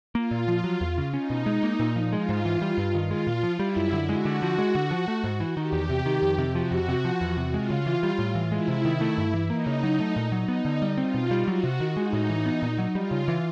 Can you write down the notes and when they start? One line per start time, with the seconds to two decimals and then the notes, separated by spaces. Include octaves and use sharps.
0.15 A#3 F4
0.31 A#2
0.48 F3
0.64 F#3
0.81 E2
0.98 C#3
1.13 C#4 D#4
1.30 B2
1.46 G#3
1.63 A#3
1.80 A#2
1.96 F3
2.12 G#3 F4
2.29 G#2
2.45 E3
2.62 G3
2.78 G2
2.95 D#3
3.10 G#3 F4
3.27 A#2
3.43 F3
3.59 G3 E4
3.76 F#2
3.93 D3
4.09 G#3 F#4
4.25 D3
4.42 F3
4.58 G#3
4.75 D3
4.91 F3
5.08 A3
5.24 G#2
5.40 E3
5.57 D#3 G4
5.72 E2
5.90 C3
6.06 D#3
6.22 F2
6.38 C3
6.55 F3 F#4
6.71 F2
6.88 C3
7.05 F3
7.21 E2
7.37 C3
7.53 G#3 F4
7.70 C#3
7.86 E3
8.03 G3
8.19 A2
8.35 E3
8.52 G#3 E4
8.68 C3
8.85 D#3
9.01 A3
9.18 G2
9.34 E3
9.50 A#3 D#4
9.66 C#3
9.83 F#3
10.00 A3
10.16 A#2
10.32 F#3
10.48 B3 D#4
10.65 D3
10.82 G3
10.98 C4 F4
11.14 B2
11.31 G3
11.47 F#3 F#4
11.64 C3
11.80 D#3
11.97 G#3 D#4
12.13 A2
12.29 E3
12.46 B3
12.62 A#2
12.78 F#3
12.95 G3 F4
13.11 C#3
13.28 E3